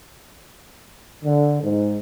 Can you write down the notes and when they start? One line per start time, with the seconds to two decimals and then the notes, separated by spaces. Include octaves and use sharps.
1.25 D3
1.63 G#2